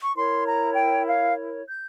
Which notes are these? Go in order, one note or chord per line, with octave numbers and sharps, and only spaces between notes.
C#6
E4 A#4 C#5 C6
A#5
G5
F5
G6